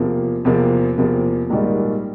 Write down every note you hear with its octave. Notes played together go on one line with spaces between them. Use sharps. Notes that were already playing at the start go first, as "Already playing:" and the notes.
Already playing: E2 C3 F3 A#3
E2 C3 F3 A#3
E2 C3 F3 A#3
A#1 G#2 D#3 G3 A#3